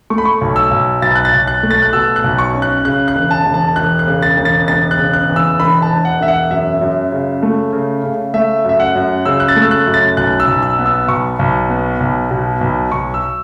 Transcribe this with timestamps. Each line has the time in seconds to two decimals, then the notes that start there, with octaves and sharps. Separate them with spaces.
0.10 A3 C#6
0.18 B5
0.25 C#6
0.41 B1
0.56 E6
0.71 B1
1.02 B1 A6
1.15 F#6
1.25 A6
1.33 B1
1.47 F#6
1.63 A3
1.71 A6
1.82 F#6
1.93 B2 E6
2.16 F#6
2.24 B1
2.38 C#6
2.54 C#4
2.62 F#6
2.85 C#3 F#6
3.08 F#6
3.15 E1
3.31 A5
3.46 E1
3.54 A5
3.76 E1 F#6
3.99 F#6
4.07 C#3
4.22 A6
4.37 E1
4.45 A6
4.68 E1 A6
4.91 F#6
4.98 C#3
5.13 F#6
5.29 E2
5.36 E6
5.60 E1 B5
5.82 A5
5.90 E1
6.05 F#5
6.20 E1 E5
6.28 F#5
6.50 F#2 E5
6.81 F#2
7.12 C#3
7.43 A3
7.73 C#3
8.04 C#3
8.34 A3 E5
8.65 F#2 E5
8.80 F#5
8.95 F#2
9.25 C#3 E6
9.40 F#6
9.48 A6
9.56 A3
9.62 E6
9.71 F#6
9.87 F#2
9.94 A6
10.17 B1 F#6
10.40 E6
10.47 B1
10.63 E6
10.78 B3
10.86 E6
11.08 B1 C#6
11.39 B1
11.69 B3
12.00 B1
12.31 B2
12.61 B1
12.92 B1 C#6
13.14 E6